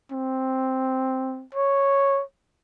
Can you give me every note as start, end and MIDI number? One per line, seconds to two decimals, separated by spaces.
0.12 1.45 60
1.54 2.22 73